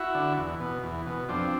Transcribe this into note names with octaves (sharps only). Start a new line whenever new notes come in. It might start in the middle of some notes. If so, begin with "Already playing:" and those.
Already playing: E4 F#4
D3
E2
B2
E2
B2
F2 C4 D4